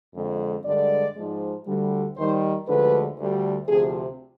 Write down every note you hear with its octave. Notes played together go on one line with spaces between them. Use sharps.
F2 D3 F3 G#3
G2 D3 G#3 D5
G#2 F3 G#3
D2 D3 G3
D#2 D#3 G3 C5
D2 D3 F3 G#3 B4
D2 D3 G3
D2 C3 F3 G#4